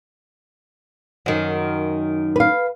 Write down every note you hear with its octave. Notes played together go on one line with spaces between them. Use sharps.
F#2 D#3
B4 F5